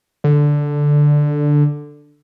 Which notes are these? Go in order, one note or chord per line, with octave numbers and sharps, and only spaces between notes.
D3